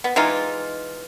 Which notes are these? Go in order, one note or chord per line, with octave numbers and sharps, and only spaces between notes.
B3
E3 G#3 D#4 F4